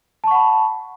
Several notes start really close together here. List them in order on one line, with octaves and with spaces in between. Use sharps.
A5 C#6 F#5 B5